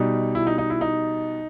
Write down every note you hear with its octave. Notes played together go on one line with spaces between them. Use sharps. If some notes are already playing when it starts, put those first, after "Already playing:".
Already playing: B2 G3 D#4
E4
D#4
D#4
E4
D#4